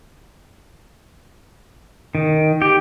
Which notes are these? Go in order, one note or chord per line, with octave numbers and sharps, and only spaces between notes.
D#3
G4